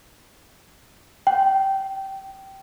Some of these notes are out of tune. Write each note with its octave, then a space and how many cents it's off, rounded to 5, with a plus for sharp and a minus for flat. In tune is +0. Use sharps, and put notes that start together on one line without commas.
G5 -20